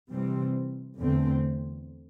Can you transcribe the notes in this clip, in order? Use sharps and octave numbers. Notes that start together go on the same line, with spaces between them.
C3 E3 G3 C4
E2 D3 A3 C4